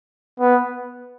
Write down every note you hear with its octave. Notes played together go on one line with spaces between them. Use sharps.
B3